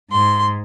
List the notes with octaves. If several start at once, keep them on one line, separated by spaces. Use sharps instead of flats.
G#2 C6